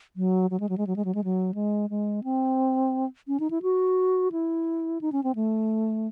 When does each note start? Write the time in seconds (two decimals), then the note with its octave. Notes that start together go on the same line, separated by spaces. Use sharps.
0.16 F#3
0.50 F#3
0.60 G#3
0.69 F#3
0.78 G#3
0.87 F#3
0.96 G#3
1.05 F#3
1.15 G#3
1.24 F#3
1.54 G#3
1.90 G#3
2.24 C4
3.28 C#4
3.40 D#4
3.51 E4
3.62 F#4
4.32 E4
5.01 D#4
5.12 C#4
5.24 C4
5.35 A3